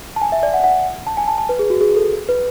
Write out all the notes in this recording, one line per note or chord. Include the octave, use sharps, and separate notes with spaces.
A5
G#5
E5
D5
F#5
F#5
A5
G#5
A5
A5
B4
G#4
F#4
G#4
A4
B4